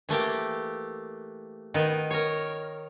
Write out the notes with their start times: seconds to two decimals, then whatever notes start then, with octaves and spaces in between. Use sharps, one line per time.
0.09 E3 A3 A#3 G4
1.74 D#3 B3 D#4
2.11 A#4 C#5